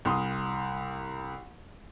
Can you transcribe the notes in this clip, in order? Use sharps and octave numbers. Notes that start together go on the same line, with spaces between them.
C2 C6 D#6